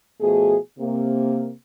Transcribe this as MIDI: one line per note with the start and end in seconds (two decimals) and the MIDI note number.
0.21 0.56 47
0.21 0.56 53
0.21 0.56 57
0.21 0.56 66
0.21 0.56 68
0.79 1.51 48
0.79 1.51 58